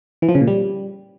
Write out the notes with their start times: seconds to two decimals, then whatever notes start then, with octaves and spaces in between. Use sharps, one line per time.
0.22 E3
0.29 F3
0.35 C#3
0.41 A#2
0.47 G3